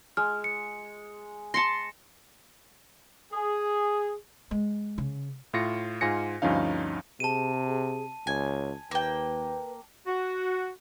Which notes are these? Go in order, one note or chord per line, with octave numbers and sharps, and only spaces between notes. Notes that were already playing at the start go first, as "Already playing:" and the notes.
G#3 F6
C#7
A5 C6 A#6 C#7
G#4
G#3
C#3
A2 F4 A#6 C#7
G#2 F4 G#5 A#6 C#7
D2 G2 F3 C#4 D#4 F5
C3 G#4 A5 D#7
G#4
C#2 C#5 G#5
D#2 A#3 B4 G5
F#4